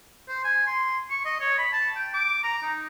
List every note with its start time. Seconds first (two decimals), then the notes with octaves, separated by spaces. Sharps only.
0.28 C5
0.44 G#5
0.67 C6
1.10 C#6
1.25 D#5
1.40 C#5
1.58 B5
1.73 A5
1.96 G5
2.14 D6
2.43 A#5
2.63 D#4